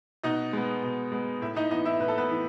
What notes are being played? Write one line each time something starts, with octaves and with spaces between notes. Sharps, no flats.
B2 D#4 D#5
G#3 B3
B2
G#3 B3
A2 E4 E5
D#4 D#5
E3 B3 D#4 D#5
E4 E5
A2 B4
A4
B3 B4
E3